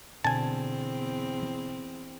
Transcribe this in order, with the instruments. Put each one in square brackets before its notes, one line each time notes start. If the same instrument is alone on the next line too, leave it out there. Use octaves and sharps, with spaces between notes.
[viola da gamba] E2 C4 [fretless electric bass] B2 D3 [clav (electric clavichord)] G#5 A5